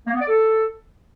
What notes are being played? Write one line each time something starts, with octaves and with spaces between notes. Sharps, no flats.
A#3
B3
D5
A4